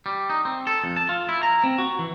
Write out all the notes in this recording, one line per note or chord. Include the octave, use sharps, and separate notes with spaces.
G3
D#4
C4
A4
F2
A5
F4
E4
A#5
C4
F#4
E3